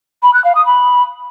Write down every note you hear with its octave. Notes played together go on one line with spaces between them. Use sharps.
B5
F#6
F5
D#6
B5